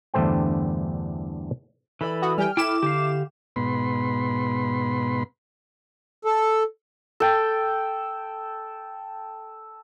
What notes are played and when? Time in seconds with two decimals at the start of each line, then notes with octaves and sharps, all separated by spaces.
0.14 E2 G2 D3 A3 C5 G5
2.01 E3 A4 D5 B5
2.22 F#4 D#6
2.38 G3 G4 G5 G#5 F6
2.57 E4 A4 G5 D6 E7
2.83 D3 G4 F5
3.56 G#2 B2 B3 B5 C6
6.25 A4
7.20 A4 G5